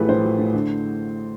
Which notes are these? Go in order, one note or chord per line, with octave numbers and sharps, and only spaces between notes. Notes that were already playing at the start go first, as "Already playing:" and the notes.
Already playing: A1 F3 A3 G4 G#4 B4
A2 C5
F3
A3
D3